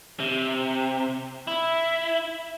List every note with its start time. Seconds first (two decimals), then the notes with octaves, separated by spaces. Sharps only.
0.20 C3
1.47 E4